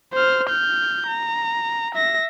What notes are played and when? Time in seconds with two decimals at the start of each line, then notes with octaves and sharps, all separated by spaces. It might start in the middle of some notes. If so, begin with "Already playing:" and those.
0.14 C5 F6
0.49 F6 G6
1.08 A#5
1.95 E5 A#6